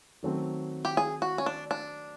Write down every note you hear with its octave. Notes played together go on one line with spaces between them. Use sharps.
D#3 F#3 A3 C4
G4
G#4
F#4
C#4
D4
D4